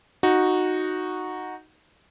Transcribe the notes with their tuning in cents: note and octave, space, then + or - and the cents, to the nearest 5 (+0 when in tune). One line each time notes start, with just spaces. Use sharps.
D#4 +0 F#4 -5